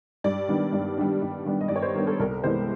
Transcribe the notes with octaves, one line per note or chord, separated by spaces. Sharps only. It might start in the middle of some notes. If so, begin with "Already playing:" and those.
G2 D5
D#3 G3 B3 D4
G2
D#3 G3 B3 D4
G2
D#3 G3 B3 D4
D#5
G2 D5
C#5
C5
D#3 G3 B3 D4 A#4
A4
C2 A#4
C3 E3 G#3 B3 C5